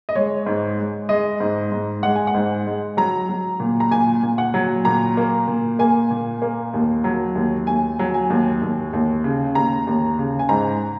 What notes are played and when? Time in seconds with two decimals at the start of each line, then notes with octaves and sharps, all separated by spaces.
0.09 D#5
0.15 G#3 C#5
0.46 G#2
0.77 G#3
1.09 G#3 D#5
1.40 G#2
1.72 G#2
2.03 G#3 F#5
2.15 G#5
2.27 F#5
2.34 G#2
2.66 G#3
2.97 F#3 A#5
3.29 F#3
3.60 A#2
3.80 A#5
3.91 A#2 G#5
4.23 A#2
4.38 F#5
4.54 F#3
4.85 A#2 A#5
5.17 A#3
5.47 A#2
5.79 A#3 G#5
6.10 A#2
6.42 A#3
6.74 D#2
7.04 F#3
7.35 D#2
7.67 D#2 G#5
7.99 F#3
8.14 G#5
8.30 D#2
8.62 D#2
8.93 D#2
9.24 C#3
9.55 D#2 A#5
9.87 D#2
10.18 C#3
10.39 G#5
10.49 G#2 A#5